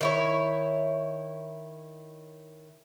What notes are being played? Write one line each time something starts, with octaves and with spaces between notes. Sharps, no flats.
D#3 E4 C#5